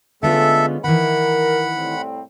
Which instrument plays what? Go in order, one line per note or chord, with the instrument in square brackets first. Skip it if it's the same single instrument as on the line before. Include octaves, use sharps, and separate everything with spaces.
[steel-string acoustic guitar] D3 B3 F4 [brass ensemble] G#3 A3 C#4 [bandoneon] A4 E5
[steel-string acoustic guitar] D#3 E3 [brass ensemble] A#4 [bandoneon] F#5 B5
[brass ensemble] C2 A2 C4